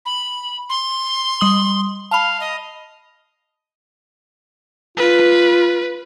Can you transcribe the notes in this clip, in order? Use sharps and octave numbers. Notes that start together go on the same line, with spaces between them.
B5
C6
G3 D#6 F#7
F5 A5 B5
D#5
F4 B4